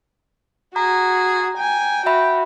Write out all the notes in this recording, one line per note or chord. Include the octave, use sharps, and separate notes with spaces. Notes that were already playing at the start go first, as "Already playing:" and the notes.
F#4 G#4 A#5
G5 G#5
F#4 E5 B5